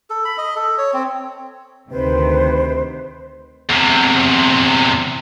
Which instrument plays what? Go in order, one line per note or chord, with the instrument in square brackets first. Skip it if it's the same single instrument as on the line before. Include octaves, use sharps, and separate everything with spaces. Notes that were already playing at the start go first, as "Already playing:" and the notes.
[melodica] A4
B5
D#5
A4
C#5
C4
[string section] D2 C3 D#3 [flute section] B4 C5
[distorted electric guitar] E2 C3